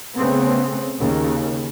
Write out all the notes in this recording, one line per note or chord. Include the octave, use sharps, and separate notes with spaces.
C#3 A3 B3 C4
D#2 C#3